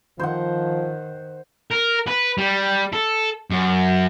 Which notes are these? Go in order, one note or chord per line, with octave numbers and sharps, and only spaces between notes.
D#3 F3 C5 F#5
A#4
B4
G3
A4
F#2